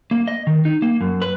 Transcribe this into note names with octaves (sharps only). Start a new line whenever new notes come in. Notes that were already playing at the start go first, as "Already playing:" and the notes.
A#3
D#5
D#3
D#4
A#3
F#2
B4